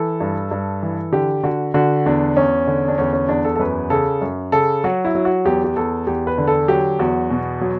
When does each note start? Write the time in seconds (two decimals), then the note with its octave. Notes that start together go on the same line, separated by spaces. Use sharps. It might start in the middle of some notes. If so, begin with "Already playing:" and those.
Already playing: E3 A4
0.20 G2
0.51 G2
0.83 E3
1.12 D3 G4
1.43 D3 F#4
1.74 D3 F#4
2.06 E2 D4
2.36 E2 C#4
2.67 D3
2.88 D4
2.98 E2 C#4
3.13 C#4
3.29 E2 D4
3.44 A4
3.55 A4
3.59 F#2 B4
3.90 C#3 A4
4.22 F#2
4.52 C#3 A4
4.84 F#3 F#4
5.05 E4
5.15 F#3
5.25 F#4
5.45 E2 G4
5.64 G4
5.76 E2 A4
6.07 E2 G4
6.27 B4
6.38 D3
6.48 A4
6.68 F#3 G4
6.99 E2 F#4
7.30 B2
7.61 F#3